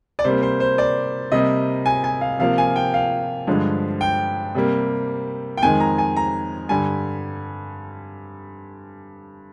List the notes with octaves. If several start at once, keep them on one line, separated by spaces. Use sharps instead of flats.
D5
C3 G3 A#3 C5
C5
C5
D5
C3 G3 A#3 D#5
G#5
G#5
F5
C3 F3 A#3 F5
G#5
G5
F5
G2 D3 F3 G#3
G5
C3 G3 A#3
G5
F2 D#3 G#3 G#5
A#5
G#5
A#5
G2 D3 G3 G#5